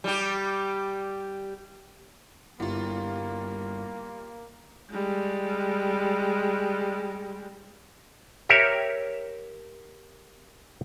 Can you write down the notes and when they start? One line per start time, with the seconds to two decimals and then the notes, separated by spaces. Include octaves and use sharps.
0.04 G3 G4
2.60 G1 G3 A#3 E4 F4
4.91 G3 G#3
8.49 G4 A#4 C#5 E5